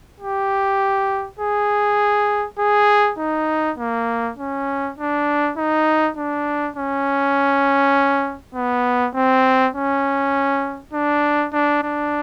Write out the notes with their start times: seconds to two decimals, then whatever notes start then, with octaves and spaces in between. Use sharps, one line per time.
0.20 G4
1.39 G#4
2.59 G#4
3.18 D#4
3.78 A#3
4.37 C#4
4.98 D4
5.57 D#4
6.17 D4
6.76 C#4
8.55 B3
9.15 C4
9.75 C#4
10.93 D4
11.53 D4
11.83 D4